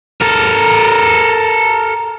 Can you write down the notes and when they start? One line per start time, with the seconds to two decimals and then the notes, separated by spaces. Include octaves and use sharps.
0.21 A4 A#4